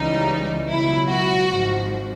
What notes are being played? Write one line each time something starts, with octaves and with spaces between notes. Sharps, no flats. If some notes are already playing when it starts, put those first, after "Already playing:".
Already playing: C#2 C#3 E3 G3 D#4
C#2 B2 F#3 E4
F#4
G#1 G#2 F3